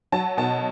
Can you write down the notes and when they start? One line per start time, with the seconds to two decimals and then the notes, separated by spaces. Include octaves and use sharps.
0.12 F#3 A5
0.37 B2 A5